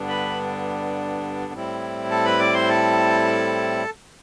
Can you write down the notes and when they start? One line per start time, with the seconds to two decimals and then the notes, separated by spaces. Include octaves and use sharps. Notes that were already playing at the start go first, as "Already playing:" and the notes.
Already playing: G2 D3 G3 B3 D4
0.08 B4 B5
1.53 A2 G3 C4 E4
2.10 A4 A5
2.25 B4 B5
2.39 D5 D6
2.54 C5 C6
2.69 A4 A5